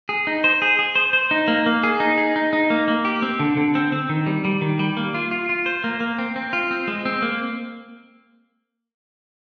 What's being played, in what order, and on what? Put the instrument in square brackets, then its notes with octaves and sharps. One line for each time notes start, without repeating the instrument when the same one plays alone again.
[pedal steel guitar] G#4
D#4
C5
G#4
G#4
C5
C5
D#4
A#3
A#3
G#4
D#4
G#4
D#4
D#4
A#3
A#3
G4
C4
D3
D3
C4
C4
D#3
G3
G3
D#3
G3
A#3
F4
F4
F4
C5
A#3
A#3
C4
C4
F4
C4
G#3
C4
A#3